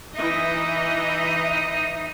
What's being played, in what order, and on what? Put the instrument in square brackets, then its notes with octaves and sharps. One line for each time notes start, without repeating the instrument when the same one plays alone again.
[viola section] E3 D#5 [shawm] D#4 [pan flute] E5